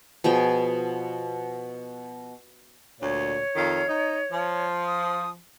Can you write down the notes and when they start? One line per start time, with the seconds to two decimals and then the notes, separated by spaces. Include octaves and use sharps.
0.24 B2 F3 G#4 G5
3.01 D2 A#2 C#5
3.56 F2 D#3 F5
3.89 D#4
4.31 F3
4.86 D#6